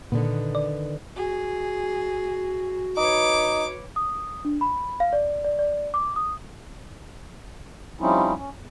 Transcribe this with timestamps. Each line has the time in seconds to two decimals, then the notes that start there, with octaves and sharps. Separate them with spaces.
0.12 A#2 D3 D#3 B3
0.55 D5
1.16 F#4 G#4
2.97 D#4 B4 C#5 D6
3.96 D#6
4.45 D4
4.61 B5
5.00 F5
5.13 D5
5.44 D5
5.59 D5
5.94 D6
6.16 D#6
8.00 F3 G3 C4 C#4 D#4 E4
8.37 C#4
8.54 E2